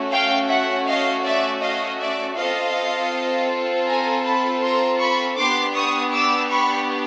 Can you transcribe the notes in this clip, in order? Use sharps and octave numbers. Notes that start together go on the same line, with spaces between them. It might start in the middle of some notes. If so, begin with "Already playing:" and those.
Already playing: A3 C#4 F#4
F5 G5
E5 F#5
D#5 F5
D5 E5
D#5 F5
D5 E5
C4 F4 A4 D#5 F5
G#5 A#5
A5 B5
A#5 C6
B5 C#6
B3 D4 G4 C6 D6
C#6 D#6
D6 E6
B5 C#6